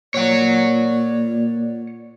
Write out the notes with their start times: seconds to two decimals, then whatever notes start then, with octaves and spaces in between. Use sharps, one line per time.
0.14 A#2 C#5 D5 F#5